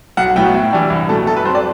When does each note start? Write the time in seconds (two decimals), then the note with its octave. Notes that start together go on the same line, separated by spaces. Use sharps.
0.17 B1 F#5
0.36 A2 F#3 B3 E4 G5
0.54 A2
0.73 E3 G3 D4
0.90 C2
1.09 B2 A3 A4
1.27 F#2 A4
1.37 B4
1.45 F#3 C4 C5
1.55 D5